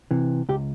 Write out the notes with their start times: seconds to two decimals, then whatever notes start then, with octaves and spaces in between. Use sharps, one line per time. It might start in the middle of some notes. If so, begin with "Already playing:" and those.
0.11 C3 E3
0.49 C#2 G4